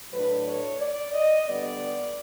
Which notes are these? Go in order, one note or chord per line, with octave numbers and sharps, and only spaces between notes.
A2 F#3 A3 D4 B4
C#5
D5
D#5
D3 G3 B3 D5